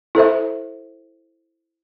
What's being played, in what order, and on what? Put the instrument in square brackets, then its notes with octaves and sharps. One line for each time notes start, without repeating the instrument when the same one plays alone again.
[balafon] E4 A4 C5 E5